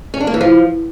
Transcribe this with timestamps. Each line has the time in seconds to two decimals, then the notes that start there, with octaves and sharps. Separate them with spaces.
0.14 C#4
0.20 D4
0.27 A#3
0.34 E3
0.41 F3